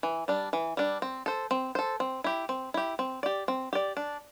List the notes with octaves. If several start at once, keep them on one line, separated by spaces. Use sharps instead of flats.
E3
G3 D4
E3
G3 D4
C4
A4 C5
C4
A4 C5
C4
E4 G4
C4
E4 G4
C4
G4 D5
C4
G4 D5
D4